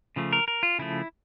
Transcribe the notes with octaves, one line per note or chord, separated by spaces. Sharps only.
C#3 F3 A3
A#4
A#4
F4
C#3 F3 A3 E4